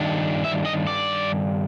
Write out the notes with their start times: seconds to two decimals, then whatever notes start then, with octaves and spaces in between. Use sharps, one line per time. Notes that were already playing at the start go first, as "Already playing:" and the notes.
Already playing: G2 D#3 D4
0.45 E5
0.66 D#5
0.87 D5